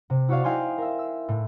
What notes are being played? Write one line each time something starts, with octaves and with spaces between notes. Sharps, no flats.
C3
E4 F#4 C#5 D5 F5
D#4 E4 F5 G5 G#5 C6
A#4 E5
E6
A2